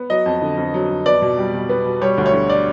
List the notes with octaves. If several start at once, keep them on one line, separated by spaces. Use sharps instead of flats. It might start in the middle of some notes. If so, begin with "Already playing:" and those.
Already playing: B3
F#3 D#5
F2
D3
F2
F#3
F2
B3 D5
B2
G3
B2
B3
B2
G3 C#5
D2
C#5
D3
D5